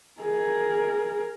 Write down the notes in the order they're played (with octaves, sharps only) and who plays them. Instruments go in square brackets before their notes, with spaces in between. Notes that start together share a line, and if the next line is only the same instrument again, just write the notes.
[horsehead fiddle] G#4 A#4